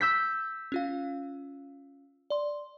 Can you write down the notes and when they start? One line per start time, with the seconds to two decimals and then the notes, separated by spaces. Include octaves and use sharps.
0.01 E6 G6 B6
0.72 C#4 F4 F5
2.30 D5 C6